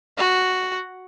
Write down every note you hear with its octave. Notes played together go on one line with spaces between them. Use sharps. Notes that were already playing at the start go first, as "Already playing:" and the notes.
F#4